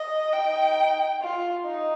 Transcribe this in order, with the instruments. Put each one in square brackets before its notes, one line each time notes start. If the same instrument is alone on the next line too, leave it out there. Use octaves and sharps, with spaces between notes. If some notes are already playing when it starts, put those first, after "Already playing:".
Already playing: [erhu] D#5
[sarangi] D#4 [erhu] G5
[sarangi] F4
D#4